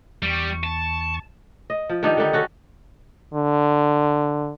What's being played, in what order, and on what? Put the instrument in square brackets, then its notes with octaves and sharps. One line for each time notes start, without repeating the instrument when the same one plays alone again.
[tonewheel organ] E2 C#6 [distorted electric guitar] G3 G4
[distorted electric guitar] A5
[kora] D#5
F3
D#3 G3 D4 D#4
D3 D#3 G3 D#4
C#4 F#4 A4
[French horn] D3